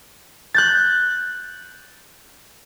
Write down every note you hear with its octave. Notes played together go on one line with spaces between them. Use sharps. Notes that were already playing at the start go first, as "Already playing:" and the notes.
F#6 G6 A6